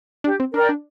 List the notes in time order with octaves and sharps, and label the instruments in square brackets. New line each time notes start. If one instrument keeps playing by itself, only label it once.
[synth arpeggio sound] D4 [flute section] G4
[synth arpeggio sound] C4
[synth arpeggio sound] D4 [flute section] A#4
[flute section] D5 G5
[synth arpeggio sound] D4